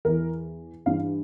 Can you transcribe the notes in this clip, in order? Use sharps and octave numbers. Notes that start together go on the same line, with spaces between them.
E2 E3 A#4
G2 E3 F5